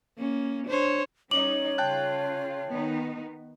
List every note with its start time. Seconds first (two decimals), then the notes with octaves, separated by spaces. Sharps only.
0.18 A#3 C#4
0.66 D4 C5 C#5
1.31 G3 C#4 D#4 C#5 D6 F#7
1.78 C#3 F4 G5 A5 F#6
2.70 D#3 B3 D#4